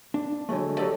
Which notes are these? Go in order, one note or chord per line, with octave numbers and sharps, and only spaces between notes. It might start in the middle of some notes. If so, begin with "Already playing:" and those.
D4
D3 F#3 G#3 A3
F#3 G4 A4 D5 D#5